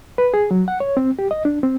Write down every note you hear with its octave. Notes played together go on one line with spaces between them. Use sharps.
B4
G#4
F#3
F#5
C#5
C4
G4
D#5
D4
C4